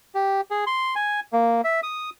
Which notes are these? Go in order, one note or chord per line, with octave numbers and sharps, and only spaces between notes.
G4
G#4
C6
G#5
A#3
E5
D#6